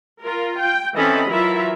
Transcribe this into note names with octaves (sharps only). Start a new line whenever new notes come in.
F4 A#4
G5
E3 C4 C#4 A4 D#5 B5
E3 F#3 E4 F4 A#4 E5